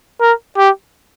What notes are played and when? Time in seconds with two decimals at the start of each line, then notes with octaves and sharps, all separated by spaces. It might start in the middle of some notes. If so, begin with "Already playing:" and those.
0.21 A#4
0.58 G4